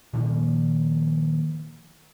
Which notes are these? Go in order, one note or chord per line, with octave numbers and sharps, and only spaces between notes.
A#2 D#3 F3 A#3